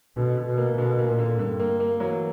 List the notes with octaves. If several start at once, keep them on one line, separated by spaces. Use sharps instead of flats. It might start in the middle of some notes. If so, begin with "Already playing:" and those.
B2 D3
D3
B2
A#3
B2 D3
A#3
A#2
D3
G2 D3
A#3
A#3
E3 F#3